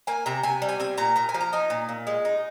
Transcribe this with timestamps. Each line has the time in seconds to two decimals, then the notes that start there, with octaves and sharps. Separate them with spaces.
0.07 A#3 G#5
0.26 C3 A#5
0.43 C3 G#5
0.62 G3
0.69 G#5
0.80 C4 G#5
0.98 A#2 A#5
1.16 A#2 A#5
1.29 G#5
1.34 F3
1.41 A#5
1.53 D#4 G#5
1.70 A#2
1.89 A#2
2.07 G#3
2.25 D#4